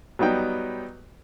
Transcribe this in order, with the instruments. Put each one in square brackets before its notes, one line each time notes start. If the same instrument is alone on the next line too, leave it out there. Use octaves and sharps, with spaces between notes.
[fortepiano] F#3 G3 B3 D#4 G5